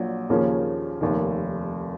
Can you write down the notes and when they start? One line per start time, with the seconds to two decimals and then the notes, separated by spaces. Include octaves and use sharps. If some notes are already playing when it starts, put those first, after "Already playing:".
Already playing: A#1 A#2 F#3
0.30 D#2 C#3 F3 A#3 C#4
1.01 F1 D#2 D#3